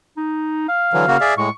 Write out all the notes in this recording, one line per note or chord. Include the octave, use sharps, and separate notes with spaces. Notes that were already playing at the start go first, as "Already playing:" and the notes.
D#4
F5
D3 E3 F#3
C#3 A#3 F#4
G#4 D5 E5
A2 G#3 C#6